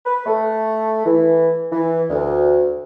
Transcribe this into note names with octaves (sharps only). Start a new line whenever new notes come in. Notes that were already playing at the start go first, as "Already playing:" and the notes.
B4
A3
E3
E3
D2